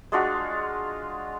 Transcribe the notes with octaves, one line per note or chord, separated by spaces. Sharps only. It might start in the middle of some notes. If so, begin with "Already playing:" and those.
G#3 D4 F4 F#4